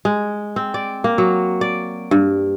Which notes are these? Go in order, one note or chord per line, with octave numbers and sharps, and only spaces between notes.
G#3
C4
D5
A#3
F#3
D5
G2